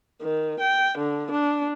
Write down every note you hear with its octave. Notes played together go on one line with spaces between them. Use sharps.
D#3
G5
D3
D4